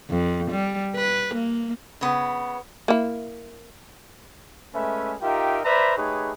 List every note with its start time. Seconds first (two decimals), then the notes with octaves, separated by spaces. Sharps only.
0.10 F2
0.51 G3
0.96 B4
1.35 A#3
2.01 C#3 B3
2.88 A#3 E4
4.74 G#3 A3 C#4 B4 E5
5.21 D#4 F4 G4 A#4 E5 G5
5.64 B4 C5 D5 E5 A#5 B5
5.97 A3 D#4 G4 G#4 B4 C#5